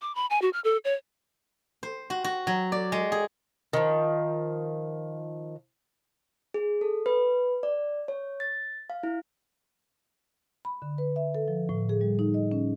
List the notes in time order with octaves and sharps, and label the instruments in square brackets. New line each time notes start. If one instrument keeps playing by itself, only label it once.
[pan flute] D6
B5
G#5
F#4
F6
A4
C#5
[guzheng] C5
F#4
F#4
F#3
D5
G#3
G#4
[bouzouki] D#3 F3
[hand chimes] G#4
A4
B4
D5
C#5
A6
F5
E4
[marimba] B5
D3
B4
E5
A4
F3
A2
G#4
G3
D#4
D#5
C#4